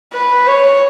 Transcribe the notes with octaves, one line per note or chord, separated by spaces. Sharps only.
B4
C#5